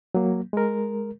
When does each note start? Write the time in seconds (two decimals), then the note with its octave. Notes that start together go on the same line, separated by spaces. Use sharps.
0.15 F#3 A#3
0.53 G#3 A#4